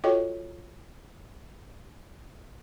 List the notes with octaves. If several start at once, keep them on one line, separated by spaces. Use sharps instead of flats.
F4 F#4 A4 C#5 D#5 G5